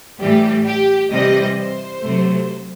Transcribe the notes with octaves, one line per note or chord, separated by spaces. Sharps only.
A2 E3 G3 G4
G4
C3 E3 G3 D#5
C5
C3 F#3 A3